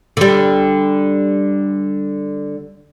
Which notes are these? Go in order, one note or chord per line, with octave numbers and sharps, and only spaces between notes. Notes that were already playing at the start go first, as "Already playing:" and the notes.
D3 G3